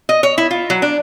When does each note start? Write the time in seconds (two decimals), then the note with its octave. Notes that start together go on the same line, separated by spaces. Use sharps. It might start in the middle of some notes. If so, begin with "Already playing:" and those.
0.09 D#5
0.23 C#5
0.38 E4
0.51 F4
0.70 F#3
0.82 D4